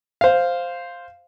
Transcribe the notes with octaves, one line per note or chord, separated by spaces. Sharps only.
C5 F5